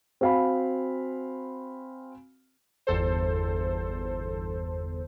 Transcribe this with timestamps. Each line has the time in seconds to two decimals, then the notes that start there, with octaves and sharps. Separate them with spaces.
0.21 C4 F#4 F5 G#5 B5
2.87 G1 E2 A4 C5